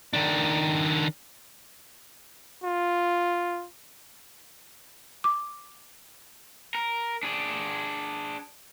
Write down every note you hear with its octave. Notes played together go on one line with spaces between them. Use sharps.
D#3 D4
F4
D6
A#4
D4 G#4